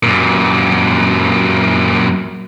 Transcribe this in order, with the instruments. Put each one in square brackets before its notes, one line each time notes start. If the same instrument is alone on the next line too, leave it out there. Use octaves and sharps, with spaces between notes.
[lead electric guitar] F#2 A#2